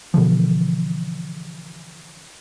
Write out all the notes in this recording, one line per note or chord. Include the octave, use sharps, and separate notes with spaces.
B2 D3 E3 F3